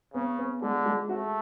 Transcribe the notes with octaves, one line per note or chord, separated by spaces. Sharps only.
C#3 B3
B3
D3 G#3
G#3
A3 F#4